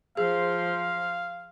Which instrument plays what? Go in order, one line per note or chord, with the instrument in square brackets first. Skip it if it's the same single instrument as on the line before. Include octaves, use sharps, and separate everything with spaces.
[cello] F3 C5 [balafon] G#4 [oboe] F5